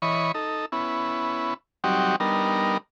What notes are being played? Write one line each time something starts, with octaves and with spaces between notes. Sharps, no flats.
E3 C#5 D#5 B5 C#6
D#4 A4
B3 C#4 E4
F#3 G3 C4 D#4 F#4 G4
G3 B3 D4 D#4 A#4